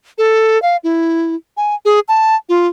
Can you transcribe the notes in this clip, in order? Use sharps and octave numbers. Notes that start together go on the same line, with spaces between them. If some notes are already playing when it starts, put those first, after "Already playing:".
A4
F5
E4
G#5
G#4
A5
F4